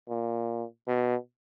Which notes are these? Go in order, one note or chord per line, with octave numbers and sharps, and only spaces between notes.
A#2
B2